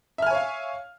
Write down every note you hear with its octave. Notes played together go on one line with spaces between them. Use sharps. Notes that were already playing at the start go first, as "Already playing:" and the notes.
C#5 E5 F5 G#5 F6